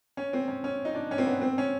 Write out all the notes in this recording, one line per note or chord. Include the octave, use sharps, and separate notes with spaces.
C#4
C4
C#4
C#4
D#4
D4
C#4
C4
B3
C4
C#4